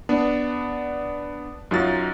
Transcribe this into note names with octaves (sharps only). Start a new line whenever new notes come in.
B3 D4
F#2 F#3 D#4 F4 A6